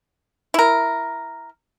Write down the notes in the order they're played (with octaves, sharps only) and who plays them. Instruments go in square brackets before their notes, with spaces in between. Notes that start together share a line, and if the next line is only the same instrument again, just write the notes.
[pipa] E4 A#4